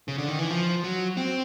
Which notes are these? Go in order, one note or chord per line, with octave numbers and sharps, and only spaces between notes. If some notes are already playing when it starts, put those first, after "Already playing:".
C#3
D3
D#3
E3
F3
F#3
C4